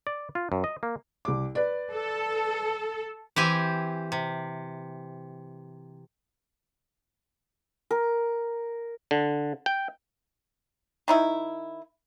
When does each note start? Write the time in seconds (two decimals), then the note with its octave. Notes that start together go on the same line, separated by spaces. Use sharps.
0.07 D5
0.35 F4
0.52 F#2
0.64 D#5
0.83 A#3
1.25 C2 D6
1.55 B4 D5
1.94 A4
3.36 E3 C4 G4 G#5
4.12 C3
7.91 A#4
9.11 D3
9.66 G5
11.08 D#3 D#4 E4